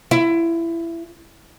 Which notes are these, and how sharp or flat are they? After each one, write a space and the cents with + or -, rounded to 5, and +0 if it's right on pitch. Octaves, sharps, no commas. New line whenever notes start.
E4 +20